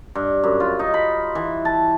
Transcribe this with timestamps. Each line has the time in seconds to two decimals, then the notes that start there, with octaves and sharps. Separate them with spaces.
0.15 G2
0.44 F#2
0.60 F4
0.79 D#4
0.94 B5
1.35 E3
1.65 A5